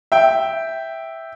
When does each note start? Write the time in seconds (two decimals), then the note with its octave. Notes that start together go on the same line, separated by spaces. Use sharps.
0.12 E5 G5